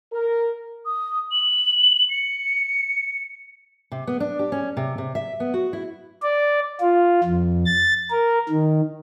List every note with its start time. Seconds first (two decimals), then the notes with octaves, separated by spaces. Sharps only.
0.12 A#4
0.86 D#6
1.32 F#7
2.10 C#7
3.92 C3
4.07 B3
4.20 D4
4.39 G4
4.52 C#4
4.77 C3
4.98 C3
5.15 E5
5.40 B3
5.54 F#4
5.73 E4
6.22 D5
6.80 F4
7.24 F2
7.66 A6
8.11 A#4
8.49 D#3